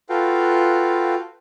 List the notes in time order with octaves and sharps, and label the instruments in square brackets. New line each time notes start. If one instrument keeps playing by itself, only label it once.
[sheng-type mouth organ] F4 F#4 A4 B4 F5 G5